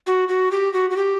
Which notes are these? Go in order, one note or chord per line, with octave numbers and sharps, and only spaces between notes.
F#4
F#4
G4
F#4
F#4
G4